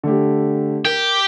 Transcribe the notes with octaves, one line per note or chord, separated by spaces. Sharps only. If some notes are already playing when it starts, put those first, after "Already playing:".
D3 A3 G4
G4 A#4